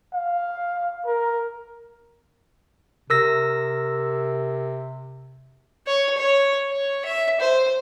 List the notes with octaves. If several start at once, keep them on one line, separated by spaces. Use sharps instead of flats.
F5
A#4
C3 A#4 E6 A#6
C#5
C#5
C#5
E5
C5